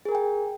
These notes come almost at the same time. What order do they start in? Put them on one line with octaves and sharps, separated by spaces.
G#4 A#4 G#5 G5